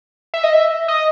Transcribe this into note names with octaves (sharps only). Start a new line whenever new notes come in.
E5
D#5
E5
D#5